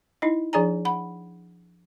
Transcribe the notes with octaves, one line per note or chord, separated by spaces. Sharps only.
D#4 E4 D#5
F3 D4 G#4 D5 G#5 A#5
F#5 B5